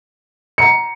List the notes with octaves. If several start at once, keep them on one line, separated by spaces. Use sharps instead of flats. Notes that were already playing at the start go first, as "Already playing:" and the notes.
F#5 A#5 C6 C#7